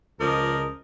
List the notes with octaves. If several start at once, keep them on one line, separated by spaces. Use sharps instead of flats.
C#2 F3 A#4 D5 D#5